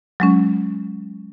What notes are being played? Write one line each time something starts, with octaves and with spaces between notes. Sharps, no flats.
F#3 G#3 C#4